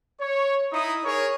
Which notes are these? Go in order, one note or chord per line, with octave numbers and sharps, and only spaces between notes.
C#5
D#4 E4 D#6
G#4 A#4 C#5